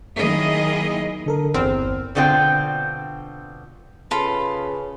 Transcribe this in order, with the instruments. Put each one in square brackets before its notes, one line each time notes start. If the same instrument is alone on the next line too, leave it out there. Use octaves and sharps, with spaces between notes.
[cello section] D#3 F#3 A#3 E4 G#4 D#5
[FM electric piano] D3 A4 A#4
[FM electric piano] G1 C5 F6 [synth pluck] E2 C4
[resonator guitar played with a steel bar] B2 D3 C4 F4 G#4 G5
[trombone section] C#3 B4 [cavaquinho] F4 A4 B5